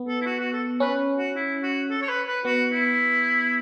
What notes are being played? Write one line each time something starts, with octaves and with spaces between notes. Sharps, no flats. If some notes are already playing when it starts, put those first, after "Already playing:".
Already playing: B3
A4
E4
F#4
F#4
A4
C#4 B4
F#4
E4
F#4
A4
C#5
B4
B4
B3 F#4
E4